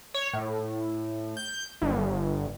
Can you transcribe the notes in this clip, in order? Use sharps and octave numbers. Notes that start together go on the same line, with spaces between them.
C#5
A2
G6
G1